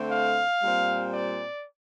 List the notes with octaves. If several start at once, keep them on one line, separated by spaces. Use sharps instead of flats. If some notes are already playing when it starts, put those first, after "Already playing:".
Already playing: D3 A3 C4
F5
A#2 G3 C4
D5